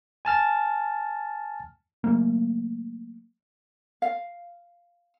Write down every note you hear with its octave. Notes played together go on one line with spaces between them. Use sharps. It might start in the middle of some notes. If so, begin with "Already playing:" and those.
G#5 A5 F6 A6
C#3 F#3 A3 A#3
F5